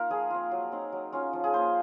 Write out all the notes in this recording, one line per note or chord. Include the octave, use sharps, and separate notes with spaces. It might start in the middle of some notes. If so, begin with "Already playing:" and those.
Already playing: A#3 D#4 F4 A#4 A#5
F3 G#4
C4 F4
F#3
C4 D#4
F#3
C#4 F4
F3
G#4
A#3 F4 C5